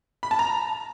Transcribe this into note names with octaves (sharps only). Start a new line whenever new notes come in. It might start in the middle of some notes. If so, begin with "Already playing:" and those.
B5
A5
A#5